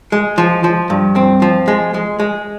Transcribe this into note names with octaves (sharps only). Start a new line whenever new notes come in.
G#3
F3
F3
G2
C4
F3
G#3
G#3
G#3